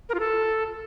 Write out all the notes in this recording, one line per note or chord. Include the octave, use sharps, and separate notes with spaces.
A#4
F4
A4